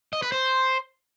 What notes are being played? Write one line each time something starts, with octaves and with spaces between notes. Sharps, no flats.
D#5
B4
C5